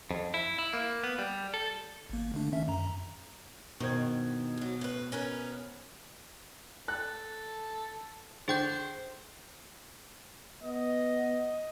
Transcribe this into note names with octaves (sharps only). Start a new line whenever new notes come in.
F2
E4
E4
A#3
B3
G3
A4
G#1 A#3
D3 A3 D4
D#3 C#4 E5
F#2 A#5
G2 B2 D#3 C5 G#6
G#2 F#3
A2 B4
C#4 A#4 B4
A4 F#6
D3 G#4 C5 G5 G6
B3 D#5